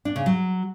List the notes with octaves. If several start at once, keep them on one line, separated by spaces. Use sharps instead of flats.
D4
C#3
F#3